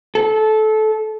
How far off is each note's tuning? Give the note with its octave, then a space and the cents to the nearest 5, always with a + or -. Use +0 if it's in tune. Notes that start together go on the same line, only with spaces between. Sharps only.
A4 -20